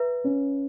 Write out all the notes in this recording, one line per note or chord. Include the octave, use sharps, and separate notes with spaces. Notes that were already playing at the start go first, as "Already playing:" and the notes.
Already playing: B4 E5 A#5
C#4